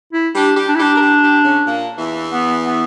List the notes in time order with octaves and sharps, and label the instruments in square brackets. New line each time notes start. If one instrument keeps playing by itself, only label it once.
[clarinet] E4
[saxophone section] G3 G4 [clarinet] D4
[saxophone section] G3 G4
[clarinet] D4
E4
[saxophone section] G3 G4 [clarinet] D4
[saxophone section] A#4
G3 G4
G3 G4
C#3 C#4
A#2 A#3
E2 E3
[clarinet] B3
B3